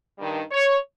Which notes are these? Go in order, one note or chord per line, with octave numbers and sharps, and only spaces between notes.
G2 D#3
C#5